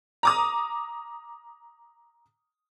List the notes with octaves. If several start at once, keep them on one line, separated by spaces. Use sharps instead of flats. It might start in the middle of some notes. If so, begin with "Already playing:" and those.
A#5 D6 D#6